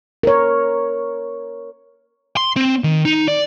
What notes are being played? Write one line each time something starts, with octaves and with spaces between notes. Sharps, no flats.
A#4 C#5
C6
C4
D#3
D#4
D5